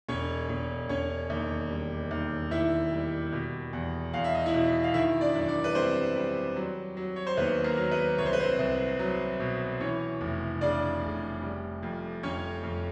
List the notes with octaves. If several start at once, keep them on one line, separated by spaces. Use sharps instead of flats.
E1 C#4 C#5
E1
E1 C#4 C#5
D#2
G3
D#2
D#2 E4 E5
G3
B2
E2
E2 F5
E5
D#5
E4 E5
B2
F5
D#3 E4 E5
D4 D5
F#2
D4 D5
B4
G3 C4 C5
G3
F#3
F#3
C#5
C5
D#2 B3 B4
A#3 A#4
F#3
B3 B4
C2 C#5
C5
B4
C4 C5
C2
F#3
B2
E3 C#4 C#5
F1
C#3 D4 D5
F1
G3
F2
F2 C#4 C#5
F2